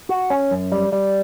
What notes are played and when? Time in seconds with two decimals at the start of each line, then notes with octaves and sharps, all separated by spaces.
0.09 F#4
0.30 C#4
0.51 F#2
0.72 G3
0.92 G3